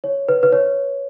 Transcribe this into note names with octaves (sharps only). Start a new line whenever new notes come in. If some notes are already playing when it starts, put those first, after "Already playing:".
C#5
B4
B4
C#5